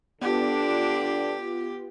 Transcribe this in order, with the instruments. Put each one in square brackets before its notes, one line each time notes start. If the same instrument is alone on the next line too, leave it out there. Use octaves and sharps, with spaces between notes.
[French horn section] D3 D4 [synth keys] B3 F4 [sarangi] G4